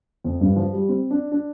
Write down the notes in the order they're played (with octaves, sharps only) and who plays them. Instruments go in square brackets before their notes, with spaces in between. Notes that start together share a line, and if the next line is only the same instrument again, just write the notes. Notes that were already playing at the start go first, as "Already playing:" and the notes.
[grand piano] F2
G2
F3
G3
C4
D4
D4